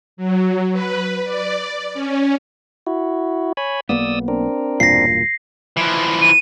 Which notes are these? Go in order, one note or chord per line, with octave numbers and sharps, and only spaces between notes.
F#3
B4
D5
C#4
E4 F#4
C#5 G#5 B5
B1 A#3 B3 D5 D#6 E6
C4 D4 A#4
E1 G2 A#2 A#6 C7
E3 F3
D#7